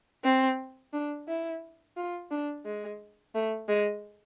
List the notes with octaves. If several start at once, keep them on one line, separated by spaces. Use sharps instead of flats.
C4
D4
E4
F4
D4
G#3
A3
G#3